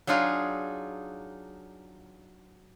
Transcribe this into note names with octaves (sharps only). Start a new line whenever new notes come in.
F#3 D4 D#4 F4 G#4